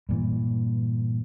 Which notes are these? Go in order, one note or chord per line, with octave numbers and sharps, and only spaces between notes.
G2 A#2 E3